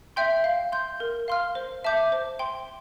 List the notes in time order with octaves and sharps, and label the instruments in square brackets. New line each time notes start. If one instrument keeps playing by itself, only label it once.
[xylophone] E5 G5 C6 G6
F5
C6 G6
A#4
F5 C6 F6
C5
E5 A5 D6 G6
C5
G5 C6